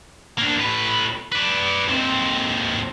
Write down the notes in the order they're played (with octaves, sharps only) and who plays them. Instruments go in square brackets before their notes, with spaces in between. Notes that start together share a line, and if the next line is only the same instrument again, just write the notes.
[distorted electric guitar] A#3 D4
A2 B4
B4 D5
D#2 C4